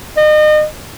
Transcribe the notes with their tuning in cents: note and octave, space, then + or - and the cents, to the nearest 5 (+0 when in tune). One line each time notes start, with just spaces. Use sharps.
D#5 -35